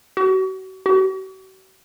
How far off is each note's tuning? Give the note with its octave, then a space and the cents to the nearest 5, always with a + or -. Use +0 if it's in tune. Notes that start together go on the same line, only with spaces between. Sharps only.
F#4 +35
F#4 +45